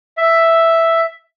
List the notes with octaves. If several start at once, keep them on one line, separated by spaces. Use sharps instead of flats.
E5